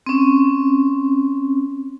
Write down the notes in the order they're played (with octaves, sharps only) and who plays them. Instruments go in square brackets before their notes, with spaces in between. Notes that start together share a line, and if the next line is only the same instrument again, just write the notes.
[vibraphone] C4 C#4